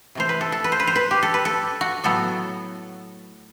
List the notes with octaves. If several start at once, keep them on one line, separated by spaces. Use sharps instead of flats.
C3 E3 A3 C5
B4
A4
A4
B4
C5
B4
C5
B4
G4
A4
B4
A4
F#4
A2 F#3 B3 A4